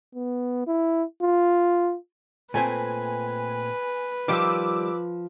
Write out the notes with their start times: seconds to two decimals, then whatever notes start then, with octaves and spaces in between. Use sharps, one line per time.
0.15 B3
0.67 E4
1.22 F4
2.54 A#2 A3 C4 B4 G#5
4.28 D#3 F3 G3 D6 E6